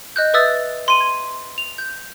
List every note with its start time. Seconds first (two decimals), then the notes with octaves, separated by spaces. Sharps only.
0.16 D#5 F#6 G6
0.34 B4 E5 D#6 E6 A6
0.88 C6 D#7 F#7
1.00 G#6
1.58 F7
1.78 G6